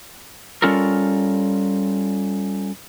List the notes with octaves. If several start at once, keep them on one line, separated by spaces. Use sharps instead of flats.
G3 C#4 F4 A4 A#4